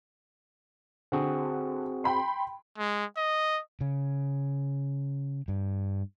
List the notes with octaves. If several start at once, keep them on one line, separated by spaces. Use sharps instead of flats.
D3 C4 F#4 G#4
G5 B5 C6
G#3
D#5
C#3
G2